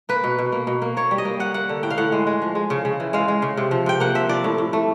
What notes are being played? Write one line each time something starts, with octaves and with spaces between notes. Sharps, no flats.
A#3 B4
B2
B2
A#3
B2
A#3
A#3 C#5
G3
D#5
A#3
G3 F#5
A#3 F#5
D3
A2 G5
F5
A2 F#5
G#3
G#3
F3
G#3
C#3
C#3
E3
G#3 F5
G#3
C#3
C3
F3
C3 G5
A#3 F#5
F3 E5
F3 D5
A2
A2
A3